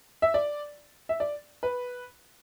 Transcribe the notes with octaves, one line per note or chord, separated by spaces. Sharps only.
E5
D5
E5
D5
B4